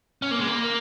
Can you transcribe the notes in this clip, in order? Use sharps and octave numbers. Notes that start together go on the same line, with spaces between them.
C#4
A#3
G#3
A#3